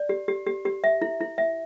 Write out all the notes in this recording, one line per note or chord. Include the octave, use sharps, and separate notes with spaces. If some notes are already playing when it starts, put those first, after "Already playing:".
Already playing: D5
G4
G4
G4
G4
E5
E4
E4
E5